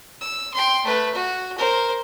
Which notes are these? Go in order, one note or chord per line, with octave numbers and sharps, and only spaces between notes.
E6
G5 C6
A3 B4
F#4
A#4 C5